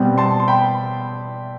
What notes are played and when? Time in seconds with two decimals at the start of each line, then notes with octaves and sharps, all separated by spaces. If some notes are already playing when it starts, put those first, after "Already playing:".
Already playing: B2 G3 C4
0.18 A5 C6
0.40 C6
0.48 G5 B5